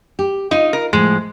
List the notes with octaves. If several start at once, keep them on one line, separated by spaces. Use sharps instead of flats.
G4
D#4 F4
A#4
A2 F3 G#3